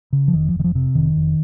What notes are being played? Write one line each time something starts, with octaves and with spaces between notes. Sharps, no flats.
C#3
F3
F1 D#3
F3
F1
D#3
F3
C3
F1 D#3
F1